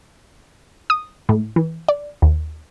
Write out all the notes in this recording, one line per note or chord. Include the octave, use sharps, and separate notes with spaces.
D#6
A2
E3
D5
D#2